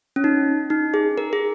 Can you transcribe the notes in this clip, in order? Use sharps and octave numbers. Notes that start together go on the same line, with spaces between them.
C#4
D#4
D#4
G#4
A#4
G#4